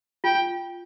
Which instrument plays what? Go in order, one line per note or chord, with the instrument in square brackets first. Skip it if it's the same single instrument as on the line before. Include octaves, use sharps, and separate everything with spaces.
[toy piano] F4 [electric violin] G5